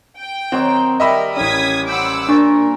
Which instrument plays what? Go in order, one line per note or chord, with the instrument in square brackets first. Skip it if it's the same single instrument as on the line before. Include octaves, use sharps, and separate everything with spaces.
[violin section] G5
[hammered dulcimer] D#3 F#3 [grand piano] C4
[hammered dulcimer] G3 [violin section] A#4 [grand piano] D#5 E5 B5
[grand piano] A1 C#4 [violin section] D#6 G#6 B6
[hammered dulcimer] C5 B5 [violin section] F#5 D6 E6
[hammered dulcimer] A#2 [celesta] D4 C#6 [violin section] A#4